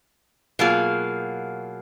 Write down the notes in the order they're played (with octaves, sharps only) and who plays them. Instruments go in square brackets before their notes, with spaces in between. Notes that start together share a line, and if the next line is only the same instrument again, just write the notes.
[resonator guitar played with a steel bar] B2 F#3 A#3 F4 G#4